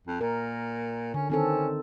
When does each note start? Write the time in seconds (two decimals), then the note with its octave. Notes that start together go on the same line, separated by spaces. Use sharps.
0.07 F2
0.21 A#2 A#4
1.14 D3 C#4
1.30 D#3 C4 C#4 A4